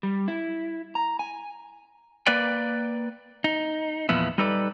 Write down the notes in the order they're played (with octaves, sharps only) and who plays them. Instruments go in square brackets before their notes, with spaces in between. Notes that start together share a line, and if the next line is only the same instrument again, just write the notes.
[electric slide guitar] G3
E4
A#5
G#5
A#3 B4 D5 G5
D#4
E2 A#2 F3 B3 E4
G3 D#4 A4 B4 D5